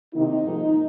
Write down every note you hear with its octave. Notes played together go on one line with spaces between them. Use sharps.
C3 D#3 A#3 D#4
G#2 F3 A#3